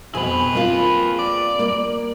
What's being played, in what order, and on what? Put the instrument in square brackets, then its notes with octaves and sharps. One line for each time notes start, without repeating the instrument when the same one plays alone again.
[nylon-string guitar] F2 B2 [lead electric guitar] G#4 B4
[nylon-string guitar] A#3 C4 F4
[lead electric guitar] D5
[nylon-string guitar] A#3